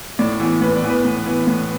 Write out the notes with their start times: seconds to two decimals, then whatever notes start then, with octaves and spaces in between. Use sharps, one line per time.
0.19 A2 D5
0.40 E3 B3
0.61 A2 B4
0.75 D5
0.83 E3 B3
0.90 B4
1.05 A2
1.26 E3 B3
1.47 A2